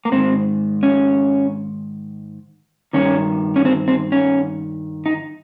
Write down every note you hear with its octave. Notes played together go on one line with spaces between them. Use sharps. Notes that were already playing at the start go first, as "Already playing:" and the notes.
A#3
G#2 D#3 C4
C#4
G2 D#3 C#4
C#4
C4
C4
C#4
D#4